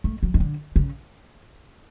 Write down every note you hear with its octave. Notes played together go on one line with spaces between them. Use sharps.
A3
F#3
D#3
D3
C#3